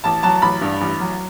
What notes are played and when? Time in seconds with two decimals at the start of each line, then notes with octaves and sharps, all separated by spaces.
0.04 A1 A5
0.23 F#3 A5
0.42 A1 B5
0.61 G2
0.81 A1
1.00 F#3